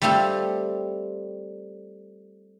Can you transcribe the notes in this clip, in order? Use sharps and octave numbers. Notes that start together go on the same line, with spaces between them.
G3 A3 C4 F4 G4